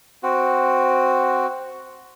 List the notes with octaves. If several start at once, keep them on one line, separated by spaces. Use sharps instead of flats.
C4 F#4